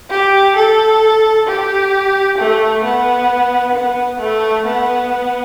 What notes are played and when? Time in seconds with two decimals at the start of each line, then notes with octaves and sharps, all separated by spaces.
0.10 G4
0.56 A4
1.48 G4
2.38 A3
2.84 B3
3.75 B3
4.21 A3
4.66 B3